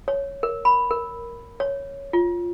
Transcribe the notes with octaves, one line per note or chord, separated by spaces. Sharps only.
C#5
A#4
B5
A#4
C#5
F4